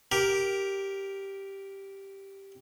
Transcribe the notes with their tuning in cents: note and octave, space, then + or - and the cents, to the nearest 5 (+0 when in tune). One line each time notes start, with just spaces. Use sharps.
G4 -5 A#4 +0